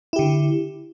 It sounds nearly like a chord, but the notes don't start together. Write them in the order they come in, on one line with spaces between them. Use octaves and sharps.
E4 G4 D3